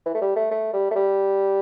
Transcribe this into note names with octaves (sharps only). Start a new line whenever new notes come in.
E3
A3
G3
A3
A3
G3
A3
G3